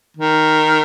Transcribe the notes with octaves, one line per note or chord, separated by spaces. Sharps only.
D#3